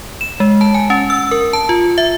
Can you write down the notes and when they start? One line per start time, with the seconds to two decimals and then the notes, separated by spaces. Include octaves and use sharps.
0.21 E7
0.40 G#3
0.61 A5
0.74 G#5
0.90 C#4
1.10 E6
1.31 A#4
1.53 A5
1.69 F4
1.98 E5